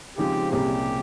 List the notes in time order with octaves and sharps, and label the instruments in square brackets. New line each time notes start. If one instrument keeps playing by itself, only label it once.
[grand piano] C#3 F3 G#3 C4 D#4 [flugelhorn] G4
[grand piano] C2 A#2 G3 C#4 G#4 [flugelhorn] G4